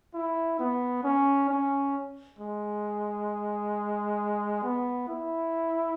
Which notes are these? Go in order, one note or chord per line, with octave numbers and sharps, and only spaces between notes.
E4
B3
C#4
C#4
G#3
B3
E4